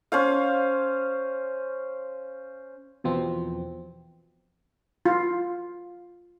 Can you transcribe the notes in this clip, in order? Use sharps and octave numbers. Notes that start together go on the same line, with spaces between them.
C#4 C5 F5
E2 B2 F3 C4
F4